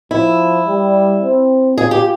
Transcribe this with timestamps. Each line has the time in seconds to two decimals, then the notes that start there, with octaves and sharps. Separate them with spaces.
0.11 F3 E4
0.67 G3
1.21 C4
1.77 F4 G#4
1.91 G4